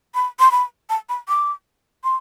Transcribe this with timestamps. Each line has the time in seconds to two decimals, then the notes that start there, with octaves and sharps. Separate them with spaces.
0.14 B5
0.40 C6
0.51 B5
0.90 A5
1.09 B5
1.28 D6
2.04 C6